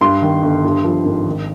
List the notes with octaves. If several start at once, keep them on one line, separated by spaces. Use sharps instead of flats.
G2 C6
D#3
G1
G2
F3
G#1
D#3